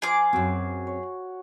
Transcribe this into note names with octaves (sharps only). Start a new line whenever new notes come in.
F3 F4 G#4 G#5 D6
F#2 C4 F#4
C#5